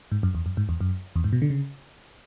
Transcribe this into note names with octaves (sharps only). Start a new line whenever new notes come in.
G#2
F#2
E2
F#2
G#2
E2
F#2
E2
G#2
B2
D3
C#3